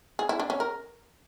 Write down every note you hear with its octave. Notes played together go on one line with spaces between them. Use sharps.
G#4
E4
D4
C#4
A#4